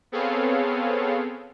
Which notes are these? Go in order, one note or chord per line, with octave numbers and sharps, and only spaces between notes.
B3 C4 G#4 A4 C#5 F5